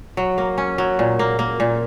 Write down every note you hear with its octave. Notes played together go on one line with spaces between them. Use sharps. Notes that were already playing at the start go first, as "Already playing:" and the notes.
F#3
A#3
C#4
F#3
A#2
A#3
A#3
A#2